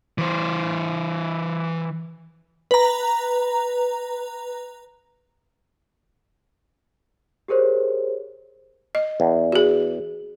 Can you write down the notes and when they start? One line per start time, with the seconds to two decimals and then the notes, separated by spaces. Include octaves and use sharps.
0.18 E3 C5
2.71 B4 A#5
7.48 G4 G#4 A#4 C5 C#5
8.95 D#5
9.20 E2
9.52 F#4 G#4